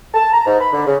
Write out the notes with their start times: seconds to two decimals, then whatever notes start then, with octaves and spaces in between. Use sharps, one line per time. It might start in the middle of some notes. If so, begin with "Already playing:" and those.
0.14 A5
0.33 A#5
0.46 G#2
0.60 B5
0.73 D3
0.87 C#3